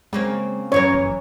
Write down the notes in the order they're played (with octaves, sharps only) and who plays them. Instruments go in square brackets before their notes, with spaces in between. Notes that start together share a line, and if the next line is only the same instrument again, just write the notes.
[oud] C#3 A#3 C4 [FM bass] G#3
[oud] F#2 E3 A#4 [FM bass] C#4 [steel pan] C#5
[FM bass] G1